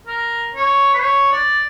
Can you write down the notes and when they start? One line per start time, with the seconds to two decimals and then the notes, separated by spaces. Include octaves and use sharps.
0.07 A#4
0.54 C#5
0.94 B4
1.00 C#5
1.32 D5